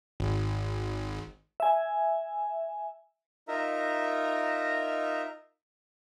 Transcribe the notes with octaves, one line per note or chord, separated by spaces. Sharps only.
G#1
E5 G#5
D#4 F4 A#4 E5 A#5